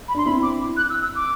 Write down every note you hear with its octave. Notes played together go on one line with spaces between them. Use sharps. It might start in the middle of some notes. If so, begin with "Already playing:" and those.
B5
D4 C6
C4 E4 B5
D6
F#6
E6
E6
D6